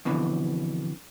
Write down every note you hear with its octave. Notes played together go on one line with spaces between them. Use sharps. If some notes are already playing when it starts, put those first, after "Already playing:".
F2 B2 D3 E3